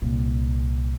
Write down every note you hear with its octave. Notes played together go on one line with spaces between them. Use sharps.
C2 A#2